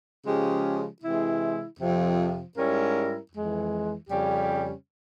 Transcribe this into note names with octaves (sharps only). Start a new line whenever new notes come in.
C#3 F3 G#3 C#4 G4
C3 E3 G#3 E4
F2 C3 F3
G#2 G3 C#4 E4 A#4
F2 E3 G#3
F2 C#3 G3 C#4 G4